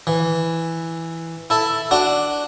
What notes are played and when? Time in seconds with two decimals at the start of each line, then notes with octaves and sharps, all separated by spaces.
0.07 E3
1.50 E4 A4
1.91 D4 F#4